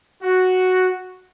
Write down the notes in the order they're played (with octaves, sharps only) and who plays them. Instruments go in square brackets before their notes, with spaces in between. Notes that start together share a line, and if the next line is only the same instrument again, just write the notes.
[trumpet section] F#4